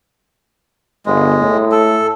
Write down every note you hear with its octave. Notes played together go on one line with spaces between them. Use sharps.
G1 G#3
A2
A4